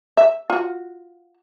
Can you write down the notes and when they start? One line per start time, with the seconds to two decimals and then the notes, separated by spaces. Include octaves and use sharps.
0.17 E5
0.50 F4 F#4